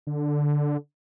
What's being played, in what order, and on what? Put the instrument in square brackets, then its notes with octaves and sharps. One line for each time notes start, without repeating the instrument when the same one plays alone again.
[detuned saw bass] D3